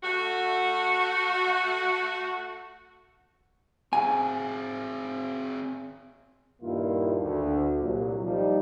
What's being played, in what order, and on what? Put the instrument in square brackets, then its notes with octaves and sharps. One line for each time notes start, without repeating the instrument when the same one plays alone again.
[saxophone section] A3 F#4
[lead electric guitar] C4 G#4 [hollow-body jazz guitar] G#5
[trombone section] G2 A#2 D#3 A#3 E4 F4
D2
C2 A#2 F#3
F3 G3 D#4